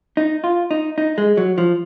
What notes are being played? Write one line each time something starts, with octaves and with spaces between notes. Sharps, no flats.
D#4
F4
D#4
D#4
G#3
F#3
F3